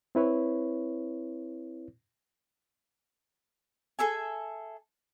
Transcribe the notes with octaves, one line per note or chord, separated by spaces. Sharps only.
C4 E4 B4 C#5
G#4 A4 E5 G#5